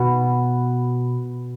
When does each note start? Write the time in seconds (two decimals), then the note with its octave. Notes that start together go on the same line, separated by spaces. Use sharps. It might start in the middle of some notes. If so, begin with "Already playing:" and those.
Already playing: B2 B3 F#4